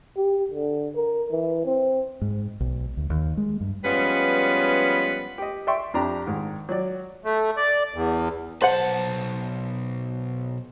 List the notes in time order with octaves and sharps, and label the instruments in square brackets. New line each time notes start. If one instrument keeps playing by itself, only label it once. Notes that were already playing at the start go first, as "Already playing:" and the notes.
[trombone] G4
D3
A#4
E3
C4
[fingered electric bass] G#2
B1
D2
D#2
G#3
G2
[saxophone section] F3 G3 G#3 B3 C#4 B4
[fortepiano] G4 D#5
D5 E5 G5 C6 C#6
F2 D4 G4 A#5
G#2 D#3
F#3 D5
[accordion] A3
D5
E2
[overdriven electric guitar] B1 A5 [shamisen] B4 F#5 [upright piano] C5